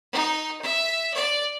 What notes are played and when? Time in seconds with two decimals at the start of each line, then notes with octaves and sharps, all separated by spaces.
0.13 D#4
0.62 E5
1.14 D5